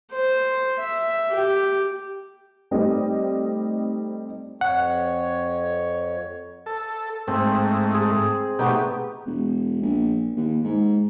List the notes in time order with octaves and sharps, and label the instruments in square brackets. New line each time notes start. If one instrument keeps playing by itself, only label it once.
[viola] C5
E5
G4
[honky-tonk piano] G3 A3 C4 D#4 D#5
[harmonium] F2 C#5 [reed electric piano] F#5
[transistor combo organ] A4
[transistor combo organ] G#2 A3 [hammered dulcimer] C4
[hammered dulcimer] G#4
[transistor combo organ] B2 G4 [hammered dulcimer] A3 B3 D#4
[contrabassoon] E1
A#1
D#2
G#2